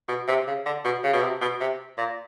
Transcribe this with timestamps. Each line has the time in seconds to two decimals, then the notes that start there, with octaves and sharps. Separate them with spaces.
0.09 B2
0.28 C3
0.47 C#3
0.66 D3
0.85 B2
1.04 C#3
1.13 B2
1.22 C3
1.41 B2
1.60 C3
1.98 A#2